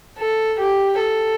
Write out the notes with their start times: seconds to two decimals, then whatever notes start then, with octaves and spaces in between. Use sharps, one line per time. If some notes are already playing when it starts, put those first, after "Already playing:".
0.19 A4
0.59 G4
1.00 A4